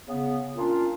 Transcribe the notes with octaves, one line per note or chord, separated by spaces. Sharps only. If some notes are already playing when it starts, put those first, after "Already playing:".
C#3 B3
A#2 C#4 D4 F4